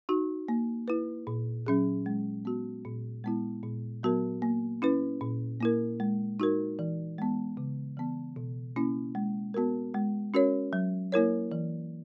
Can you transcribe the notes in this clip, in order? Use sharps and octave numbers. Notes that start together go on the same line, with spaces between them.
D#4 F#4
A#3
E4 B4
A#2
F#3 C#4 G#4
G#3
B3 F#4
A#2
G#3 B3 E4
A#2
F#3 B3 F#4 A#4
A#3
C#4 E4 B4
A#2
A#3 E4 A#4
G#3
D#4 F#4 A#4
E3
G#3 B3
C#3
E3 B3
B2
A#3 C#4 E4
G#3
B3 F#4 A#4
G#3
C#4 F#4 A#4 C#5
F#3
A#3 E4 A#4 C#5
E3